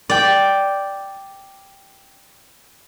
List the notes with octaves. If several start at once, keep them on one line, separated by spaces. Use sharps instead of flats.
D5 G5